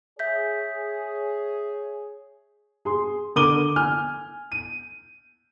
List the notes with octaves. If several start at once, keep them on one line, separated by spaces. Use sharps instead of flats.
G#4 C#5 E5 G6 B6
G#4 C6
D3 A#4 D6 D#7 G7
G#5 F6
D#7